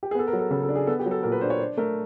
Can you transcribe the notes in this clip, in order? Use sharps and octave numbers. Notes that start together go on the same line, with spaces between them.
G4
G#4
B3 A4
A#4
F#3
A4
C#3 A4
A4
D4
G#4
B3 A4
G4
F#3
A4
A#2 A#4
B4
D4 C5
C#5
D4 C5
A3 A#4